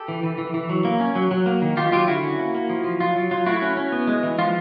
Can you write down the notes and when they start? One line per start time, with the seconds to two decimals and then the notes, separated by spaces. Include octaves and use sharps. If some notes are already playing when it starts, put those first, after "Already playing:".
Already playing: G4 A4
0.08 E3
0.23 E3
0.38 E3
0.54 E3
0.69 F#3
0.85 A#3
1.00 C#4
1.15 F#3
1.31 F#3
1.46 A#3
1.62 D#3
1.77 D#3 F4 G4
1.92 F#3 F4 G4
2.08 D3 E4 F#4
2.23 C#4
2.39 A#3
2.55 A#3
2.70 F3
2.84 F3
3.00 F#3 F4
3.16 F#3
3.31 F#3 F4
3.46 A3 E4 F#4
3.62 C#4
3.77 C#4
3.92 B3
4.07 G#3
4.23 E3
4.39 F3 F4